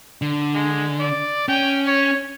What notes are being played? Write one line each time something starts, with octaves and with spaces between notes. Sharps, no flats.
D3
G#3
D5
C#4 G5
C#5